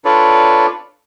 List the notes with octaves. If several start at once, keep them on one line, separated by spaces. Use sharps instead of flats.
D4 F4 A4 B4 C#5 D5